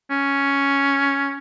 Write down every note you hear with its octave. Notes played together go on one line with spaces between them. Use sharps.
C#4